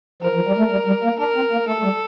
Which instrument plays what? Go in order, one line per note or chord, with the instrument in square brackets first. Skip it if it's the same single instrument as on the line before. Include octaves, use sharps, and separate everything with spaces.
[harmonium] F3 [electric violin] A#4
[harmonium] F3
G3
A3
G3
G3
A#3
[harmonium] D4 [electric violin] A#4
[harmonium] C4
A#3
[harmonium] A3 [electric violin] A4
[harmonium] A3
G3